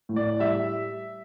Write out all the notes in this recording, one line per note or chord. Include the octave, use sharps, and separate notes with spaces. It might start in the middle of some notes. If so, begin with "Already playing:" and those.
A2
D5
G3 E5